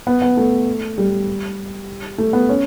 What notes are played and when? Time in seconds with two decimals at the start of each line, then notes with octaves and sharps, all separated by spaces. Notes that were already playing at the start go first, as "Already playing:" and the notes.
0.07 B3
0.22 B3
0.37 A3
0.98 G3
2.18 A3
2.33 B3
2.49 C#4